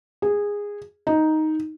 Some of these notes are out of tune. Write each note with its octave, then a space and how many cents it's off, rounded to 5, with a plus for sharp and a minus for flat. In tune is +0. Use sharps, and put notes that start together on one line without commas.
G#4 -15
D#4 +5